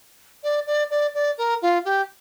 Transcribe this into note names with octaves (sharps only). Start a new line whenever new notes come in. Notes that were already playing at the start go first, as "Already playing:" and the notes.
D5
D5
D5
D5
A#4
F4
G4